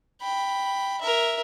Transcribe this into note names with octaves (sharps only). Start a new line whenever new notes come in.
G5 B5
A#4 E5